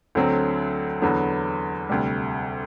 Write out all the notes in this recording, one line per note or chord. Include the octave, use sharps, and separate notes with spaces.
D2 D3 F#3 A3 C4
E2 D3 F#3 B3
D2 C3 G3